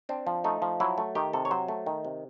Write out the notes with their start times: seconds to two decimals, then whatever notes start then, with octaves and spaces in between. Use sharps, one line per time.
0.09 C4 D4
0.27 F3
0.44 A3 D#4
0.62 F3
0.80 F#3 E4
0.98 A3
1.15 D#3 G4
1.33 C3 A4
1.45 C#5
1.51 F#3 C5
1.68 A3
1.86 D#3
2.05 C3